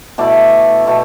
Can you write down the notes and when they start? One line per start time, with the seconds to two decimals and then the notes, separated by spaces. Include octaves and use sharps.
0.18 B2 A3 E4 D5
0.85 B2 A3 E4